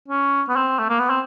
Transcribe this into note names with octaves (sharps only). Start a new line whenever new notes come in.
C#4
B3
C4
A3
A#3
B3
C4